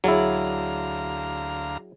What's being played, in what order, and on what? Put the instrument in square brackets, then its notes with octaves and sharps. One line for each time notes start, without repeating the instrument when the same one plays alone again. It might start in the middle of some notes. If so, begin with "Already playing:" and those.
[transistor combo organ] D2 F5 A#5 [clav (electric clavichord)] F#3 E4 [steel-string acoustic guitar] G#4 D5